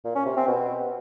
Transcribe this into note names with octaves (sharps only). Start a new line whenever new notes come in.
A#2
C#4
C3
C4
B2